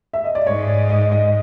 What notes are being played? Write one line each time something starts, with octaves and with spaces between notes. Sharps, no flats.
E5
D#5
D5
G#2 C#5
D5
D#5
D#5